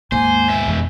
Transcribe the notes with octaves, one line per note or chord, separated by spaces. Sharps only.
D#2 G#2 A#3 C5 G#5
B2 E5
F2 E3 G#3